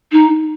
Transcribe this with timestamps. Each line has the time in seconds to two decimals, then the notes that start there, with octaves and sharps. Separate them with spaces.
0.12 D#4